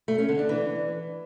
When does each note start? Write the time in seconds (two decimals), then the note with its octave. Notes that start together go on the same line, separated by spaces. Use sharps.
0.08 A3
0.18 C#4
0.29 D3
0.39 D4
0.49 E3